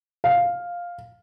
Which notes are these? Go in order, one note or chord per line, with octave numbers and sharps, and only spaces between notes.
F5